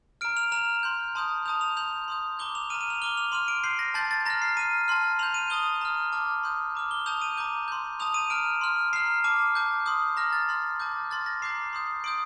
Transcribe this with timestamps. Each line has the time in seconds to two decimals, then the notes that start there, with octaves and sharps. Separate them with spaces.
0.21 A#5 F6 D7
0.37 F7
0.52 A#5 F6 F7
0.83 C6 G6
1.15 A5 C6 D#6 G6
1.46 A5 D#6 G6 F7
1.61 F7
1.77 C6 G6 F7
2.08 C6 D#6 G6
2.39 A#5 D6 G6 G7
2.55 F7
2.70 A#5 F6 D#7
2.81 D#7
2.90 F7
3.02 A#5 D6 F6 G7
3.17 F7
3.32 C6 F6 D#7
3.48 D7
3.64 C6 G6 C7
3.79 A#6
3.94 A5 C6 G6 A6
4.11 A6
4.25 A#5 F6 A#6
4.42 C7
4.57 A#5 F6 D#7
4.88 A5 C6 F6
5.19 C6 G6 F7
5.34 D#7
5.50 A5 D#6 G6 G7
5.81 A#5 F6
6.12 A5 D6 F6
6.43 C6 D#6 G6
6.75 A#5 D6 F6
6.91 G7
7.06 A5 D#6 G6 F7
7.21 D#7
7.37 A#5 D6 G6
7.68 C6 G6
7.99 A5 D#6 G6 F7
8.14 D#7
8.30 A#5 F6 D7
8.61 C6 F6
8.93 A#5 F6 C7
9.24 A5 D6 F6
9.55 A5 D6 G6
9.86 C6 D#6 G6
10.17 A#5 F6 A#6
10.33 A6
10.49 C6 F6
10.80 A5 D6 G6
11.11 C6 F6 A6
11.26 A#6
11.42 A#5 D6 G6 C7
11.73 C6 D#6 G6
12.04 C6 D#6 G6 D7